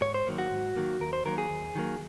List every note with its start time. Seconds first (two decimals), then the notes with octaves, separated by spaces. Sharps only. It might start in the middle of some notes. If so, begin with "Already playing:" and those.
0.01 G#2 C#5
0.14 C5
0.27 D#3 F#3 A#3
0.38 F#4
0.51 G#2
0.76 D#3 F#3 A#3
1.00 D#2 A#4
1.13 C5
1.25 D#3 F#3 A#3 A#4
1.38 G#4
1.50 D#2
1.75 D#3 F#3 A#3